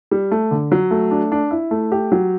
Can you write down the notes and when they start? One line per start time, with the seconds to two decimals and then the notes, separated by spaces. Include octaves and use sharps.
0.11 G3
0.31 A3
0.51 D3
0.72 F#3
0.91 A3
1.11 D4
1.32 D4
1.51 E4
1.71 A3
1.92 G4
2.12 F#3